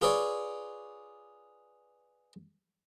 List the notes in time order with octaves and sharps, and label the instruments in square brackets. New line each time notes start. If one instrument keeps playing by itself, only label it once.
[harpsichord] F4 G#4 B4 C#5 D5